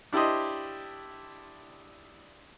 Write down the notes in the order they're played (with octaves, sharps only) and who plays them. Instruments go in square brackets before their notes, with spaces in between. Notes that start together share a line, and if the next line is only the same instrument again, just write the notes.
[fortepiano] D4 E4 G4 C5 D#5